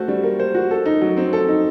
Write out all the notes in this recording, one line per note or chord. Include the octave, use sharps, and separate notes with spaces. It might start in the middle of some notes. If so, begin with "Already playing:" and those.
Already playing: A3 F#4 C5
G3
A#3
C5
F#4
A4
D#4
F#3
C4
A4
D#4